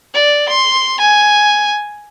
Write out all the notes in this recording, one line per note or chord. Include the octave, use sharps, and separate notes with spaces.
D5
C6
G#5